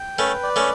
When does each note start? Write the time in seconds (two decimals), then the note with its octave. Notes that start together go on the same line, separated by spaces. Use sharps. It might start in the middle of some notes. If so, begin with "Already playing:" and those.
Already playing: G5
0.18 A3 C#4 B4
0.43 D5
0.56 A3 C#4